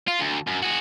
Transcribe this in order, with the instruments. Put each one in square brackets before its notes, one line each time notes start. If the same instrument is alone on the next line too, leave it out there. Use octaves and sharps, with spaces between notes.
[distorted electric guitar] F4
D2
F#2
F#4 G#4